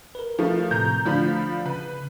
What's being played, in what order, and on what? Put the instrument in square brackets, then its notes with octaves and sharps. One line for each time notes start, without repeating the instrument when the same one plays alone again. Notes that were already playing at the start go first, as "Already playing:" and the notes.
[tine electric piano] A#4 B4
[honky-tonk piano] F3 A3
[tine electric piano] A2 C3 [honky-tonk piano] A#5 G6
[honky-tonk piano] D3 F3 B5 [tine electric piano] A3
[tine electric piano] C#3 [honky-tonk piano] B4